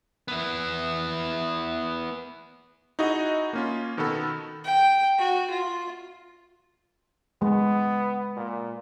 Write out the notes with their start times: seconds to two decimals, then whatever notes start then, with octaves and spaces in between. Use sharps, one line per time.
0.28 B3 E4
2.99 D#4 E4 F#4 G#4 D#5
3.53 A#3 C#4 F4
3.97 B2 D#3 B3 F#4 A4 B5
4.64 G5
5.18 F#4
5.50 F4
7.42 G#3 B3
8.37 A#2